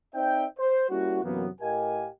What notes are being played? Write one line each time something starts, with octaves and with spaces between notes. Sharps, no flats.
C4 D#4 C5 D5 E5 G5
C5
G3 A#3 C#4 E4 F#4
F#2 C3 E3 F#3 A#3 B3
A2 G4 A#4 D#5 F5 G#5